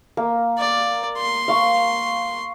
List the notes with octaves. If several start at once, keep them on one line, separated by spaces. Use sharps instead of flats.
A#3
D5
C6
F5 C#6